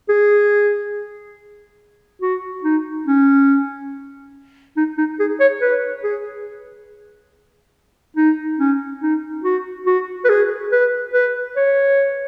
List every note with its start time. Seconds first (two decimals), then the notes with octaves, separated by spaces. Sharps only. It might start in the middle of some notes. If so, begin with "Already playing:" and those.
0.09 G#4
2.22 F#4
2.63 D#4
3.07 C#4
4.77 D#4
4.98 D#4
5.19 G#4
5.40 C#5
5.61 B4
6.03 G#4
8.17 D#4
8.59 C#4
9.01 D#4
9.44 F#4
9.86 F#4
10.24 B4
10.29 G#4
10.72 B4
11.13 B4
11.56 C#5